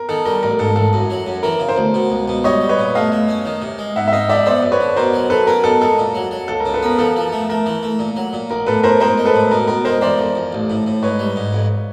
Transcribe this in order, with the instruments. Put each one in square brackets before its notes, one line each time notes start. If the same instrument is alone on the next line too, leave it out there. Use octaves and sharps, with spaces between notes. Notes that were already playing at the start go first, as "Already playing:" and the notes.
Already playing: [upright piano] A#4
[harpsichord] D#3 [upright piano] A4
[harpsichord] G3 [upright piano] A#4
[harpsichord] A1 [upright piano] A#4
[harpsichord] G#2 [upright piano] A4
[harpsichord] A1 [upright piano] A4
[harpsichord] F#2
F#3
F#2
[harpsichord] E3 [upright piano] A#4
[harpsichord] C#3
[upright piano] A#4 C5
[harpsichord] D2
B2
C#2
B2
[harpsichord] G3 [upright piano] C#5 D#5
[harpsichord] G3
[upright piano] B4 C#5
[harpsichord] A#2
[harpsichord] A3 [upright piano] D#5 F5
[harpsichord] A3
C#4
D#3
C3
G#3
[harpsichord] G#2 [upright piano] E5 F#5
[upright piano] E5
[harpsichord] C4 [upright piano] D#5 F5
[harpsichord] F3 [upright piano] D5 E5
[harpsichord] B3 [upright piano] C5 D5
[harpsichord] F#2
[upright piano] B4 C#5
[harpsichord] D3
[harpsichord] B2 [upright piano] A#4 C5
[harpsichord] F#3
[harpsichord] F#3 [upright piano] A4 B4
[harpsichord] C#4 [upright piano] A#4
[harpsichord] B2 [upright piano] A4
[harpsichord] G#3 [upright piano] A4
[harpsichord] A#2
F#3
F#3
[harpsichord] C#2 [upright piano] A4
[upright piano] A#4
[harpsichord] C#3
[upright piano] A4 B4
[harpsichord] B3 [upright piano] A#4
[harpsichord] F3 [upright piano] A4
[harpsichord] F3
A3
[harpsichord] A3 [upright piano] A#4
[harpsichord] E3
A3
A#2
F#3
A#2
[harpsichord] A#1 [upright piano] A#4
[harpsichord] A2 [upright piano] A4 B4
[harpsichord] A2 [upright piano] A#4 C5
[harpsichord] G#3 [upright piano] A#4 C5
[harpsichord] G#3
[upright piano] A4 B4
[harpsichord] A2
[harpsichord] B2 [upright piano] A#4
[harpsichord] B2 [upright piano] A#4
[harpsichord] G#3 [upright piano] A#4 C5
[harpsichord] E3 [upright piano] C5 D5
[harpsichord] F2
F2
A1
A2
A2
[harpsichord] G#2 [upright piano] B4 C#5
[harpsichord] G3
G#2
F2